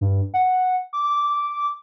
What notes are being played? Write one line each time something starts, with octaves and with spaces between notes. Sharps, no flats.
G2
F#5
D6